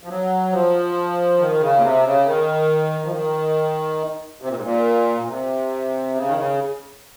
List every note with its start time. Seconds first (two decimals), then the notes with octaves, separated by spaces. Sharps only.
0.03 F3
0.09 F#3
0.52 F3
1.39 D#3
1.60 C#3
1.76 A#2
1.82 C3
2.04 C#3
2.26 D#3
3.04 F3
3.12 D#3
4.42 C3
4.49 A#2
4.56 G#2
4.63 A#2
5.21 A#2
5.28 C3
6.15 C#3
6.27 D#3
6.37 C#3